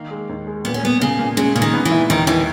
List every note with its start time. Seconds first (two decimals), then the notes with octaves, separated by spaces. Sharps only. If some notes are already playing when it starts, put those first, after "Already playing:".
Already playing: D#3 A#3
0.11 G#3
0.29 D#2
0.47 G#3
0.65 A#2 B3
0.74 C#4
0.83 A#2 B3
1.01 A#2 C#3
1.19 A#2
1.37 C#3 G#3
1.56 A#2 C#3
1.62 D#3
1.73 B3
1.85 E3
1.92 E4
2.10 D#2 D#3
2.27 D#2 E3